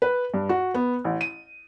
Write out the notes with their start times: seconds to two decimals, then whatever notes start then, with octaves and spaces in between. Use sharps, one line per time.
0.02 B4
0.34 G2
0.49 F#4
0.74 B3
1.04 A1
1.21 D#7